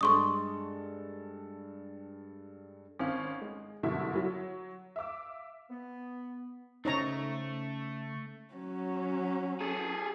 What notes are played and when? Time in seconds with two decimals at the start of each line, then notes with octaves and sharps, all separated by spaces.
0.01 G2 G#3 A4 C6 C#6 D#6
2.99 G#1 C4 C#4 F5
3.41 G#3
3.83 F#1 G2 B2 D3 E4 E5
4.16 F#3
4.96 E5 F5 D6 E6
5.70 B3
6.85 C#3 A3 C#4 D#4 C5 C#5 A#5
8.54 F#3 C#4
9.61 G#4 A4